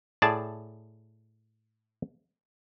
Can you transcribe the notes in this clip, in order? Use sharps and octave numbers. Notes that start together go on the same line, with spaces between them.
A2 G#4 D5 A5